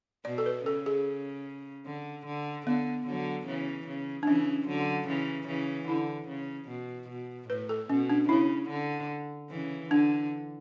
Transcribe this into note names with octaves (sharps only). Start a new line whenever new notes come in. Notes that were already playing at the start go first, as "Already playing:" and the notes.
B2 D5
A4
B4
C#3 A4
G#4
D3
D3
D3 B3
D3 F#3
C#3 E3
C#3
D4
C#3 E3 C#4
D3 F#3
C#3 E3
C#3 E3
D3 E4
C#3
B2
B2
A2 B4
A4
B2 C#4
D4
C#3 E4
D3
C#3 E3
D3 D4